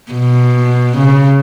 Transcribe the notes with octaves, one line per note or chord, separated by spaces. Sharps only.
B2
C#3